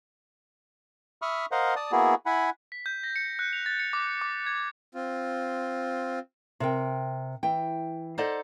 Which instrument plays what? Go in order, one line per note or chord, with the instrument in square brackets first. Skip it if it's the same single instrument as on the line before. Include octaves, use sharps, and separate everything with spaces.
[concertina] E5 B5 C#6 D#6 F6
A#4 C5 D#5 F5 F#5
D5 A5 D#6
A#3 B3 E4 F#4 G#4
E4 F#5 G#5 B5
[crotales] B6
G6
A#6
C#7
F#6
F7
A6
C#7
D6
D6
G#6
[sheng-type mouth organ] C4 F4
[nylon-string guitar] C3 A#4 G5
E3 G5
D#4 A4 C5 D5 D#5 F#5